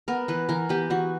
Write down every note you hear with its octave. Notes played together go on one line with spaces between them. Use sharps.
B3 A#4
E3 B4
E3 A#4
B3 G4
E3 F#4